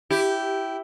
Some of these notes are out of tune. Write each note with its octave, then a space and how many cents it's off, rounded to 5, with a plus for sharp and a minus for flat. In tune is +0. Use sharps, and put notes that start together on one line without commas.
E4 +0 G4 -10